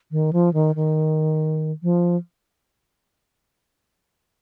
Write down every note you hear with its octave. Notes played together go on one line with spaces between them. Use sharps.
D#3
F3
D#3
D#3
F3